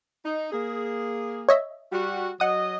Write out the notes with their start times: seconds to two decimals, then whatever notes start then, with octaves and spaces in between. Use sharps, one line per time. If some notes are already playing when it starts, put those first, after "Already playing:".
0.25 D#4
0.52 A#3 G#4
1.49 C#5 D#5 E5
1.92 G3 F#4
2.40 F#3 D#5 F#5 D#6